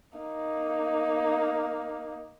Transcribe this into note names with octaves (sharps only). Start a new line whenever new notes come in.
A#3 D#4